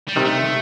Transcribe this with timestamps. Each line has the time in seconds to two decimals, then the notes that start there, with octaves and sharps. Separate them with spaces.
0.08 G3
0.16 C3 D#3
0.24 A3